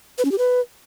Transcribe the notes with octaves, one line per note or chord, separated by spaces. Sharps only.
B4
C#4
G4
B4